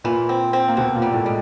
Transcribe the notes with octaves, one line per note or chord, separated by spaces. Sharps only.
A#2 E3 A#3
C4
C4
A#3
B2 B3 C4
A#2 A#3
G3
A2 A3
G3 G#3